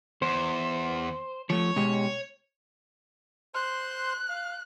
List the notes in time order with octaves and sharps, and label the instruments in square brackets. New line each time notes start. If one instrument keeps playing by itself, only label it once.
[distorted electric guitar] E2 [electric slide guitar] C5
[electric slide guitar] F3 A3 [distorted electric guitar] C#5
[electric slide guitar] B2 G#3 G4
[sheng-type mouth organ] C5 C6 [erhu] F#6
[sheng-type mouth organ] F5